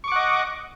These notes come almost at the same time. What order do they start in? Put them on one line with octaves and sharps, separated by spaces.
C#6 D6 F#5 D#5